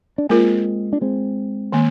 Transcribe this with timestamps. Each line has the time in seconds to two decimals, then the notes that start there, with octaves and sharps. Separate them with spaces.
0.18 D4
0.29 G#3 A#3 C4 F4 A#4
0.93 D4
1.01 G#3 C4
1.72 D#3 A#3